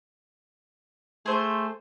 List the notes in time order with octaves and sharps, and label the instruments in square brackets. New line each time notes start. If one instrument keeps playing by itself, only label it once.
[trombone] A3 [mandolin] G#4 C5